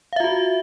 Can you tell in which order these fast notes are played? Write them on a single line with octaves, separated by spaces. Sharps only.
F5 E5 F4 F#4